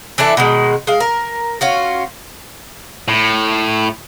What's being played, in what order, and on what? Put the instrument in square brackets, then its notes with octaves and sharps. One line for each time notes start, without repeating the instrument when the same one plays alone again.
[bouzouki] E3 D4 E4 A4
B2 D#3 G#3
G#3 F5
A#4
C#4 F4 F#4
[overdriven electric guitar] A2